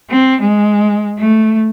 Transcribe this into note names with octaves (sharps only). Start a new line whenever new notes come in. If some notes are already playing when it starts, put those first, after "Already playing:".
C4
G#3
A3